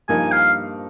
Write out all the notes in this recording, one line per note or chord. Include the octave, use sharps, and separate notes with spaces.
G2 F3 A#3 D#4 A#4 G#5
F5